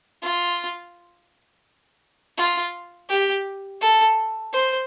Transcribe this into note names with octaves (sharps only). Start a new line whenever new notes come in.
F4
F4
G4
A4
C5